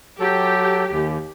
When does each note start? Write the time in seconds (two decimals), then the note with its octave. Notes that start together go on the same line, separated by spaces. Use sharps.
0.20 F#3 G4 A4
0.91 D#2